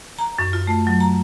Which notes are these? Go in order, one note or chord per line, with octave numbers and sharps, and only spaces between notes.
A#5
F#2
F4
A3
F#3
A#5